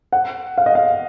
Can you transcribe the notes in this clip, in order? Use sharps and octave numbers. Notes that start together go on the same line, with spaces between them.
F#5
F5
D#5
F5